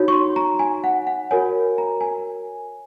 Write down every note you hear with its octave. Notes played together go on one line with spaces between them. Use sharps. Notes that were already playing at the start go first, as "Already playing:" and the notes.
Already playing: D#4 F#4 C#5
C#6
C6
A#5
G#5
F#5
F#5
F#4 A#4 C#5 G#5
A#5
G#5